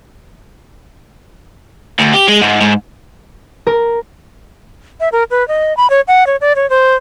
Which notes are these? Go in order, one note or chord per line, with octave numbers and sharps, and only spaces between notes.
D2
G4
G#3
G#2
G#2
A#4
E5
A#4
B4
D#5
B5
C#5
F#5
C#5
D5
C#5
C5